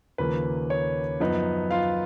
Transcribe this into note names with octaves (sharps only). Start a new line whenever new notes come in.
D#2 C#3 F3 A#3 B4
C#5
F#2 F3 B3 D#4
F4 F5